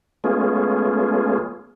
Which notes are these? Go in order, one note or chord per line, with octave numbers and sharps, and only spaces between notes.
G#3 A3 B3 C#4 F4 G#4